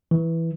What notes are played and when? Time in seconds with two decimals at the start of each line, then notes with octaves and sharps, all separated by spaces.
0.11 E3